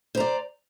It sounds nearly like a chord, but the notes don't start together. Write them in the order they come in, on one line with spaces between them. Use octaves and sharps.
C5 A#5 D5